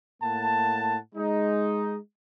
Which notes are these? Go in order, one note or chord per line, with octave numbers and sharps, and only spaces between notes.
A2 A#3 F#5 A5
G#3 D#4